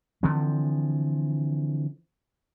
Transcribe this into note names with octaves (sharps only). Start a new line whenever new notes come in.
D3 E3 F3 C4